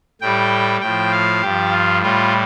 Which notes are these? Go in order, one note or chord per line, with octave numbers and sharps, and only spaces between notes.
A2 G3 G5
A2 F3 G5
F5
G2 F3 G4
F4
A2 G3 F4